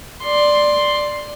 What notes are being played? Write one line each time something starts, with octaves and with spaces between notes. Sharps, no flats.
D5 C6